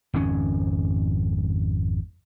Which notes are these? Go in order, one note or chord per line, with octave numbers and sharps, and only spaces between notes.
G#1 F2 C#3 C#4